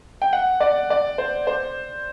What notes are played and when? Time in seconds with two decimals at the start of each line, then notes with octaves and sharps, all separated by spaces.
0.22 G5
0.33 F#5
0.61 D5
0.90 D5
1.18 C5
1.47 C5